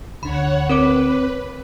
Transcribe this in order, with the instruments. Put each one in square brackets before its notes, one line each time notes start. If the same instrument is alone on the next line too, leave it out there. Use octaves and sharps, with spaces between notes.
[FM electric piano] D2 D3 [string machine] C#5 F#5 [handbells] B5
[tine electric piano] C4 [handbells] A#4 C#5 D6 [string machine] B4